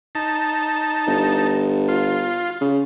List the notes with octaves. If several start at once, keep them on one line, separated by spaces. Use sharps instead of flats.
D#4 A5
G1
F4
C#3